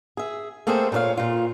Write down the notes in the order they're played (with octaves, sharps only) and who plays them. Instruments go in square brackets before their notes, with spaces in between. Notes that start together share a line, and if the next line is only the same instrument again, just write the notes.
[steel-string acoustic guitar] G#4 E5
A3 A#3 C4 G#4 A4 C5
A#2 A3 A4 C#5 F5
A#2 F4